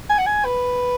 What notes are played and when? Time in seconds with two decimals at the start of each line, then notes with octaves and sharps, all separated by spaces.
0.09 G#5
0.18 F#5
0.26 G#5
0.45 B4